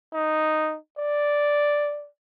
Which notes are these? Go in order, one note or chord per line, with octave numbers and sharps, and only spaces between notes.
D#4
D5